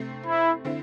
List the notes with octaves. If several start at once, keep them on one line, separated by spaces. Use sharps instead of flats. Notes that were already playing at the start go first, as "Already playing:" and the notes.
Already playing: C3 A3 C4
E4
D3 C4 E4